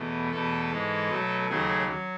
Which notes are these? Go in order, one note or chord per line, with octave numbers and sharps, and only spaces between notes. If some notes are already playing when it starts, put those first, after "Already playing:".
Already playing: E2 B2 A3
E2 B2 A3 A4
G#2 E3 G#3
B2 F#3 A3
D#2 C#3 F#3 A3 G#4
F#3